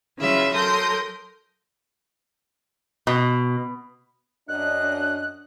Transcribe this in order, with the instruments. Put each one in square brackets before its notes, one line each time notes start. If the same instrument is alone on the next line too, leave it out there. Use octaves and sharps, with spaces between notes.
[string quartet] C#3 E3 F#3 F4 E5 B5
F#3 A4 A#4 C6 D#6 G6
[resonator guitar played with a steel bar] B2
[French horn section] F#2 D4 D#5 [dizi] F#6